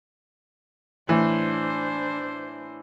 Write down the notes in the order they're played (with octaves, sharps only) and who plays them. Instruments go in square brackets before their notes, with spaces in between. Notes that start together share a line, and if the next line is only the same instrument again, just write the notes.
[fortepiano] A2 E3 [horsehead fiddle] D4 C5